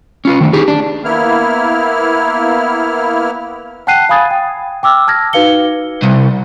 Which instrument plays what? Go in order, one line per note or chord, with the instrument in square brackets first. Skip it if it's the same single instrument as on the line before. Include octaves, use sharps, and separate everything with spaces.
[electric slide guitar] C#4 F4 B4
D#3 A3 D4
D#4 G4 G#4
D4
[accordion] A#3 B3 E4 F6
[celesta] F#5 G5 A5 F#6 C7 D#7
F5 G#5 B5 D#6 G#6 A6
G5
G5 D6 E6 F6
A5 F6 G#6 A#6
D#4 F#4 B4 F5 C#7 G7
[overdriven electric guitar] C2